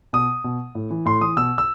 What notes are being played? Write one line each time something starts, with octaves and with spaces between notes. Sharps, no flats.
B2 D#6
B2
A2
E3
A2 C6
E3 D#6
B2 E6
E6